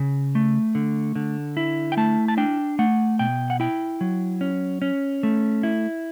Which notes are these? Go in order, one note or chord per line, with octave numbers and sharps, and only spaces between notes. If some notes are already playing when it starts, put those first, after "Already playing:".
Already playing: C#3
A3
D3
D3
E4
G5
A3 A5
A5
D4 G5
A3 F#5
B2 G5
F#5
E4 G5
F#3
C#4
C#4
A3
E4